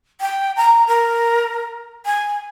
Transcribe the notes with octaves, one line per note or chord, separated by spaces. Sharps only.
G5
A#5
A#4
G#5